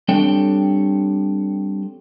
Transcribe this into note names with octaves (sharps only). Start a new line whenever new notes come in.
G3 C4 D4 A4 C#5 G5